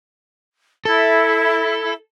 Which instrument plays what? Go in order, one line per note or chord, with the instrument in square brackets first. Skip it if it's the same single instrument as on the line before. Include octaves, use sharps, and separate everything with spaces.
[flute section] E4 [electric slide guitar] A4